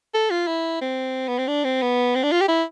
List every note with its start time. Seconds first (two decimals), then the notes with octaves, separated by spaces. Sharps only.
0.14 A4
0.31 F4
0.47 E4
0.81 C4
1.28 B3
1.38 C4
1.48 D4
1.64 C4
1.82 B3
2.15 C4
2.23 D4
2.32 F4
2.41 G4
2.48 E4